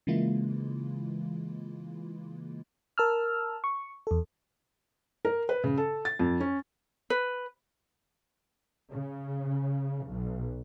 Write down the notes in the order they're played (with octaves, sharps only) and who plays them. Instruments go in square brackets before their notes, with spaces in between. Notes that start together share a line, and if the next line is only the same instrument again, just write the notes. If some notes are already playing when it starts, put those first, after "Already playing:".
[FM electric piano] C#3 E3 G#3 A#3 E4 F4
A#4 A5 E6 F6
C#6
E2 A4
[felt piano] A#4
B4
C#3
A4
A6
F2
C#4
[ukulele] B4
[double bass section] C#3
B1